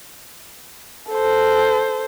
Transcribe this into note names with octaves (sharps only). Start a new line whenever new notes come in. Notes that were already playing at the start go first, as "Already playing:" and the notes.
A4 C5